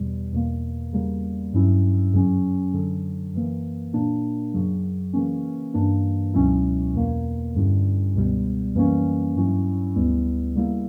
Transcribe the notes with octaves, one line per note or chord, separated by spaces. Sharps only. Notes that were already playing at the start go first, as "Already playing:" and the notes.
Already playing: E2 B2 G3
E2 B2 A#3
E2 C#3 G3 A#3
G2 F#3 C#4 E4
F#2 C#3 F#3 C#4
F#2 D3 F#3
F#2 E3 A#3
A#2 A#3 D4
F#2 C#3 F#3
C#3 E3 A#3 C#4
G2 E3 A#3 D4
C#2 B2 F#3 C#4 E4
E2 B2 A#3
G2 D3 G3 C#4 E4
C#2 B2 G3 B3
F#2 E3 G3 A#3 C#4
G2 F#3 C#4 E4
D2 C#3 G3 B3 E4
C#3 G3 A#3 E4